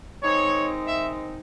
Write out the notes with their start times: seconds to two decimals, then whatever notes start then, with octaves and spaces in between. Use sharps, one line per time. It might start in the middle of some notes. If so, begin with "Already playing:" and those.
0.22 D#3 G#3 C4 D#4 C#5
0.87 E5